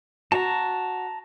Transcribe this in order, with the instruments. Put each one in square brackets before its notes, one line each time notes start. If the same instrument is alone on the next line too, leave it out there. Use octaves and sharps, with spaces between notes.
[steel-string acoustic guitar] F#4 [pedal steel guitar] A5 A#5